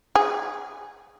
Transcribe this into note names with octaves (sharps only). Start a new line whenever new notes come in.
G#4